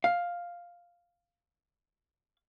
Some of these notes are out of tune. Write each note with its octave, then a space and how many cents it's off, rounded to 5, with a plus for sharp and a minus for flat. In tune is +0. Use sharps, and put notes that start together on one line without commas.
F5 +5